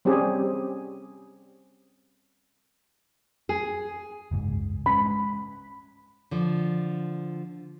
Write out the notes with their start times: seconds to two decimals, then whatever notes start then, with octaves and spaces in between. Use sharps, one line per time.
0.05 G3 C4 C#4 G4 G#4
3.49 G#4
4.31 F#1 C#2 G#2
4.86 G#3 A#3 C#4 B5
6.31 D3 F3